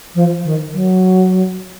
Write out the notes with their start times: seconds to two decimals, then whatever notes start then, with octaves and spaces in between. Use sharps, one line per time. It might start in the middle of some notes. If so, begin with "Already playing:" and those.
0.15 F3
0.44 D#3
0.73 F#3